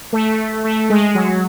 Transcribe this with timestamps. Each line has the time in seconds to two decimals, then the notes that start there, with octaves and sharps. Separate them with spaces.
0.13 A3
0.64 A3
0.90 G#3
1.15 F#3